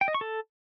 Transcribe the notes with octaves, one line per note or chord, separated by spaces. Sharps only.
G5
D#5
C#6
A4